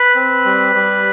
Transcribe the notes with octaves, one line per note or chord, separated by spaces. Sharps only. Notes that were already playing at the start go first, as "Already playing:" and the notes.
Already playing: B4 B5
C4
G3
G3